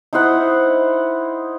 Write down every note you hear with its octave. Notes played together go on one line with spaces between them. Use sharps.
D#4 E4 C5 F#5